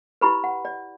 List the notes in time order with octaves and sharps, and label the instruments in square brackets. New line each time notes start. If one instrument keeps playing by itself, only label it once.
[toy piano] E4 G4 B4 B5
F#5
D5